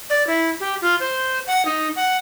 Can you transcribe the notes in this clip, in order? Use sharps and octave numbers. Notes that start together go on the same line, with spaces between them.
D5
E4
G4
F4
C5
F#5
D#4
F#5